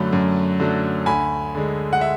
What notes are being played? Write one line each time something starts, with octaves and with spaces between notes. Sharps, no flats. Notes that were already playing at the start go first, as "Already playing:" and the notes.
Already playing: F#2 D3 F#3 A3 B5
F#2
D3 F#3 A3
D2 G#5 B5
D3 G#3
F#5
E5